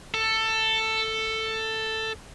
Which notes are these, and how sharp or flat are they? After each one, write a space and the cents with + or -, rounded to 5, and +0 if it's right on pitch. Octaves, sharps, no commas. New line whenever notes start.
A4 +10